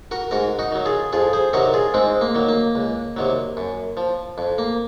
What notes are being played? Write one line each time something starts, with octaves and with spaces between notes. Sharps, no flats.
F#4 A#4
G#2 F#4 A#4
D#4 F#4
D#3 F#3
F4 G#4
F2 F4 G#4
G#4 C5
C3 D#3 F#3 F#4 A#4
F4 G#4
G#2 G#3 C4
A#3
D#3 F#3
A#3
C#2
C3 D#3 F#3
F#2
F3
F2
A#3